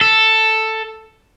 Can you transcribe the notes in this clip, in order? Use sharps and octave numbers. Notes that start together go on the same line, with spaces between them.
A4